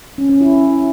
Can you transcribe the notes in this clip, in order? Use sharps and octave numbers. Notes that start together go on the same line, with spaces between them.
C#4
C#4
E4